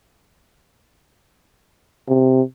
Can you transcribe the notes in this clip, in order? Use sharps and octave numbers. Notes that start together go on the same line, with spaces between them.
C3